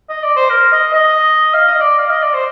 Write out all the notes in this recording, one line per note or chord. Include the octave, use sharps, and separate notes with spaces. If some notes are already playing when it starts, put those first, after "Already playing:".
D#5
D5
C5
A#4
D#5
D#5
F5
D#5
D5
F5
D#5
D5
C5